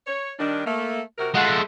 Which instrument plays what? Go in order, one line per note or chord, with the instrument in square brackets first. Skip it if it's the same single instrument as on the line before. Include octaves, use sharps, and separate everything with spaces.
[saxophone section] C#5
D#3 G3 D4
A3 A#3
C3 F#4 A#4
[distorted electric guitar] G#3 A3 [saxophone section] F4 F#4 F#5